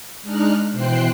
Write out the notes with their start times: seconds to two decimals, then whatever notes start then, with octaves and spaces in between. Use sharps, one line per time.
0.23 G#3 D4 D#4 F6 F#6
0.72 B2 E3 C5 G5 F#6 C7